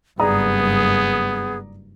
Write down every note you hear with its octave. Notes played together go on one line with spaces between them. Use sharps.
F#1 G2 B3 G#4 D5 A#5 D#6